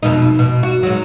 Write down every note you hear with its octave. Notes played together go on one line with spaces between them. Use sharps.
F2 B2 D#4
B2
F#4
G#2 F#3